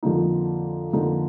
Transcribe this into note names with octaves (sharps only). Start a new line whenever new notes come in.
F2 D3 F3 A#3 D#4
F2 D3 F3 A#3 D#4